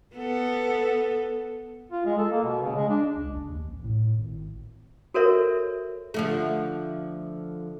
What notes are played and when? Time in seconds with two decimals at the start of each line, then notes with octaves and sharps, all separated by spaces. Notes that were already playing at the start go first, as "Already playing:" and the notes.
0.15 B3 A4
1.91 F4
2.05 G#3
2.18 A4
2.31 A#3
2.43 B2
2.62 C#3
2.76 G#3
2.89 D4
3.16 C#2
3.29 F#1
3.48 D#2
3.67 A1
3.83 A2
4.17 G#1
5.14 F#4 A4 A#4 C5 C#5 E5
6.14 D3 F3 A3